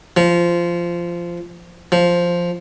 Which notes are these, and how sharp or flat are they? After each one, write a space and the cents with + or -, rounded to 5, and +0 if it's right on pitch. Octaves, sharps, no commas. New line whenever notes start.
F3 -15
F3 +0